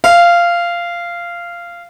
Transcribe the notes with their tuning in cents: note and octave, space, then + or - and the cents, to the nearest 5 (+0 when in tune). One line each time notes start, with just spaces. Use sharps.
F5 -15